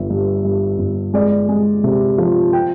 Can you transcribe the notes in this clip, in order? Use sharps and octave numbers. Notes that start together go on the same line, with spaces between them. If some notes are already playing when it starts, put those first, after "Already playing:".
Already playing: G1 E5
G2
G2
G1
G#3 D5
G#3
C3
F3
G5